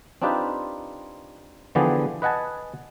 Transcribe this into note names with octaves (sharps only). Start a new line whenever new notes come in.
C4 D4 D#4 F4 G4 B4
D3 E3 F3 B3 G4 G#4
B4 D#5 F#5 G#5 A5